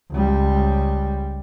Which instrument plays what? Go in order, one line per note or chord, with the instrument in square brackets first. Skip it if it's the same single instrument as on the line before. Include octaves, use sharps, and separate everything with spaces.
[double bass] C#2 G3